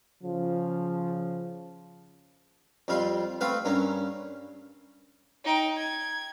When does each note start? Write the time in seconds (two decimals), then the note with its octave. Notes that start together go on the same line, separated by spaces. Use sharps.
0.23 C#3 F3
2.88 F2 G3 F4 C6
3.41 A3 C4 B4 F5
3.65 G2 A#3 C#4
5.44 D#4 G5
5.78 G#6